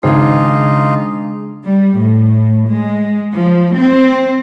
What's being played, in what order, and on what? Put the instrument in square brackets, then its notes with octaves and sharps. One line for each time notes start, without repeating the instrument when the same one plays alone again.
[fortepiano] G#1 [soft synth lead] C#3 [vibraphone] G#3 D4 G#4 [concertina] D#4 F4
[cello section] G3
A2
G#3
F3
C4